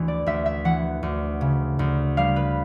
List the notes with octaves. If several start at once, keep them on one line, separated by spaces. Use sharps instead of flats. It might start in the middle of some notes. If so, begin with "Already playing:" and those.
Already playing: D2 E3
D5
D2 E5
E5
E3 F#5
D2
C#3
D2
G3 F5
B4